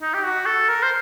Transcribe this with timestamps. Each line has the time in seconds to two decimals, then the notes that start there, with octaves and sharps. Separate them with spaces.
0.02 D#4
0.14 G4
0.23 F#4
0.46 A4
0.69 A#4
0.83 C5